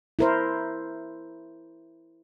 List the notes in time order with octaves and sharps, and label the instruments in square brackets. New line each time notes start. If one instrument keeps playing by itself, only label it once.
[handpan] E4 A#4 C5